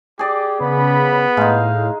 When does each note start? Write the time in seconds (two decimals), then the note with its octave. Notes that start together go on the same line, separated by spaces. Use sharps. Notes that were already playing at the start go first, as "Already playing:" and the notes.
0.19 G4 G#4 D5
0.61 C#3 B3 B5
1.37 A2 G#3 D#4 F5